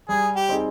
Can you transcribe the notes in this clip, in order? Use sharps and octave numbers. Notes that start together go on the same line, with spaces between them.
G3 G#4
G4
C4 D#4 G#4